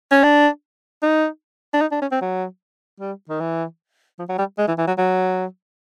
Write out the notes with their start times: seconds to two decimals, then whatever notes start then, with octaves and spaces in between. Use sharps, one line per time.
0.11 C#4
0.23 D4
1.02 D#4
1.74 D4
1.81 D#4
1.92 D4
2.01 C#4
2.12 C4
2.21 F#3
3.00 G3
3.29 D#3
3.40 E3
4.19 F3
4.29 F#3
4.39 G3
4.58 G#3
4.68 E3
4.78 E3
4.87 F#3
4.98 F#3